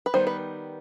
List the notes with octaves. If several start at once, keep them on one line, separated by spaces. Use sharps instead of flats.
B4
D#3 G3 B3 C5
B4